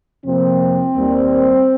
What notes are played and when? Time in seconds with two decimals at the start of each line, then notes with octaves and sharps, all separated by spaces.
0.25 F2 C3 F3 A#3 C4
0.96 D#2 D#3 G3 A#3